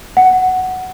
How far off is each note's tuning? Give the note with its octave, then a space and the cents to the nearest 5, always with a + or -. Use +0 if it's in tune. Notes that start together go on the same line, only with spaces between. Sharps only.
F#5 +5